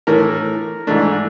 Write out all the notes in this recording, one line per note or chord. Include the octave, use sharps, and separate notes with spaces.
A2 E3 A3 A#4
G#2 E3 A3 D4